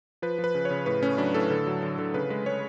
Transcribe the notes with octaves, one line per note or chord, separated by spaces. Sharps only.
F3 B4
F3
B4
C#3
C#5
C#3
A2 B4
A3 C#4
F#3 D4
A2 A4
D3
F#3
D3
D3
C#3 B4
G#3 B4
G#3 C#5